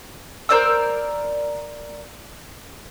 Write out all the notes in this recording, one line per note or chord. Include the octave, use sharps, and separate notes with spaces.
A#4 C5 D5 E6